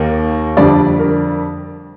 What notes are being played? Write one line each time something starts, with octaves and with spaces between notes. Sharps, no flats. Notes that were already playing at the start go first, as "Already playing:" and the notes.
Already playing: D#2 D#3 A#3
F2 D3 G3 D4 D5
A#4